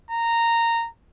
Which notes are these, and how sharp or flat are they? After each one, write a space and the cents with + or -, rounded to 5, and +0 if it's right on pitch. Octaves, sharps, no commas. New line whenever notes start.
A#5 -10